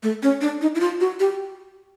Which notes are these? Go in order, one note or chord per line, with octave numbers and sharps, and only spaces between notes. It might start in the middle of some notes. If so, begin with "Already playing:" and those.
A3
C#4
D4
D#4
E4
F4
F#4
G4